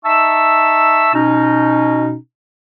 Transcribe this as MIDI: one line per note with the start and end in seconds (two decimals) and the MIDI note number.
0.05 1.11 63
0.05 1.11 76
0.05 1.11 81
0.05 1.11 85
0.05 1.11 88
1.14 2.15 47
1.14 2.15 61
1.14 2.15 63